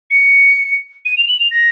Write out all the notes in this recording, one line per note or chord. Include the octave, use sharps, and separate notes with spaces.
C#7
D#7
F7
F#7
F7
A#6